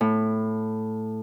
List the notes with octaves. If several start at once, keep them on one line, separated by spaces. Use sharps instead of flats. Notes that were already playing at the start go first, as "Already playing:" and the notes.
A2